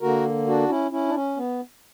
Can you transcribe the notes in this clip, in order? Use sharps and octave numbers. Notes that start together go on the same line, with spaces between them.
D3 A#3 F#4 A#4
D4 F#4
C#4 E4
C#4 E4
D4
C#4
B3